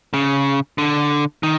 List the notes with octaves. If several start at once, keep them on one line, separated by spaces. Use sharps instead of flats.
C#3
D3
D#3